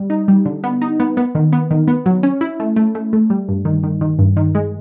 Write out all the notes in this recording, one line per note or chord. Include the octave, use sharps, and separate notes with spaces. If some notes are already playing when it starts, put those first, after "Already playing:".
Already playing: G3
D#4
G3
D3
B3
D#4
B3
B3
D#3
B3
D#3
B3
F#3
C#4
E4
A3
A3
A3
A3
G3
G2
D#3
D#3
D#3
G2
D#3
G#3